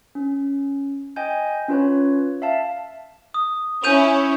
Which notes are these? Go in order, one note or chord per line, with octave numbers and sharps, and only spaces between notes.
C#4
D#5 G5 G#5 G6
C#4 F4 B4 C#5
E5 F5 A5
D#6
C#4 E4 G6 D#7 F7